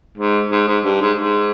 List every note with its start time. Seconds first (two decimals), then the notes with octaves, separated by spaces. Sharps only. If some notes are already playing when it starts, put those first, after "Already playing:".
0.18 G#2
0.51 G#2
0.68 G#2
0.84 G2
1.01 G#2
1.17 G#2